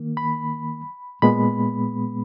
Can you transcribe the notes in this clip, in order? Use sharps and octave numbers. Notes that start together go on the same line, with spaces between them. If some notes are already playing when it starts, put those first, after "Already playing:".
Already playing: D#3 A#3
B5
A#2 G#3 B3 B5